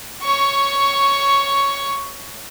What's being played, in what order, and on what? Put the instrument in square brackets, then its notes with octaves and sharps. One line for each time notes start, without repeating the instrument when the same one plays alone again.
[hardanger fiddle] C#5 C#6